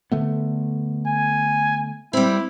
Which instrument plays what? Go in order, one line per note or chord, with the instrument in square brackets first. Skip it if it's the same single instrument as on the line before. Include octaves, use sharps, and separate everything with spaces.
[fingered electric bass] D3 A3 B3
[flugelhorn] G#5
[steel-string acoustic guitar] G3 C4 [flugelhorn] E4